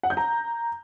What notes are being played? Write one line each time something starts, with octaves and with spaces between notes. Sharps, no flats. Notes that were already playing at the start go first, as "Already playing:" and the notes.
F#5
G6
A#5